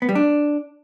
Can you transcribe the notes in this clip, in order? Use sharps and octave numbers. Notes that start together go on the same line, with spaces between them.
B3
G3
D4